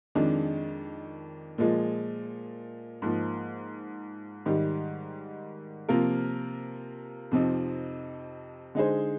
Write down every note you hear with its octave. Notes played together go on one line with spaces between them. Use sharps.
F2 D#3 G#3 D4
A#2 F3 G#3
G#2 F3 A#3
G#2 D#3 G3
C3 F3 A#3 F4 A#4
F2 C3 F3 C4 D#4
D3 G#3 D#4 G#4 C5